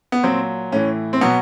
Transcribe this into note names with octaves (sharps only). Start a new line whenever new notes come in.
B3
A#2 F#3 C4
A2 E3 C#4
C4
B2 F#3 B3